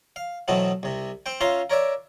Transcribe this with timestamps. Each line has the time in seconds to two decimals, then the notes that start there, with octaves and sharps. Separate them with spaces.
0.16 F5
0.48 B2 E3 F#3 A3 B3 C4
0.83 C2 C3
1.26 C4 C5 G5
1.41 C#4 F4 E5 F5 A#5 C6
1.70 A#4 C#5 D5 E5